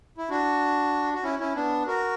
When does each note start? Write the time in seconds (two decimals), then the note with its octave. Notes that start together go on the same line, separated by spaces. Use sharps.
0.18 E4
0.30 D4 F#4
1.14 F#4
1.23 C#4 E4
1.39 C#4 E4
1.55 B3 D4
1.87 F#4 A#4